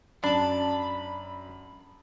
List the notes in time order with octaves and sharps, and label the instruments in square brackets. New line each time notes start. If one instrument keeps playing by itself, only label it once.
[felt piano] F#2 [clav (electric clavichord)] D4 [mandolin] D5 A5 [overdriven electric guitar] B5